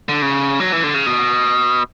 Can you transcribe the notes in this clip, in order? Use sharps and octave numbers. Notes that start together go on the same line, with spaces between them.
D3
C#3
F#3
E3
D3
C#3
B2